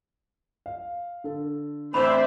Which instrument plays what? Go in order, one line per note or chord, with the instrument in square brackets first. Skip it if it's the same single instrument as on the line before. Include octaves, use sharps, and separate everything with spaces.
[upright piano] F5
D3 A4
[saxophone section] A2 E3 C4 [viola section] C5 D5 E5 [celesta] B5